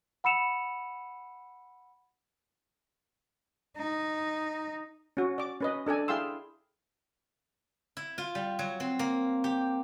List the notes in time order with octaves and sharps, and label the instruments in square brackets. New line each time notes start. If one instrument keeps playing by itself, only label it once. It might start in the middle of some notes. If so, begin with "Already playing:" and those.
[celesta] F#5 B5 E6 C#7 E7 F7
[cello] D#4
[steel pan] C#4 F#4
D5 D6
C#4 B4 D#5
D4 A4 D5 G#5
E4 G#4 F5 G5 C6 E6
[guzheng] E4
F4
G3
F#3
C4
A#3
G4